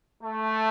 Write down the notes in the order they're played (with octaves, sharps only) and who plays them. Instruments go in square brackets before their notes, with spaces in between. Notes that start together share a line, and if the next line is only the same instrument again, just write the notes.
[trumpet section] A3